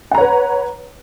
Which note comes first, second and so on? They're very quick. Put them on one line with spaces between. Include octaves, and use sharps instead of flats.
F#5 A#5 C#5 B4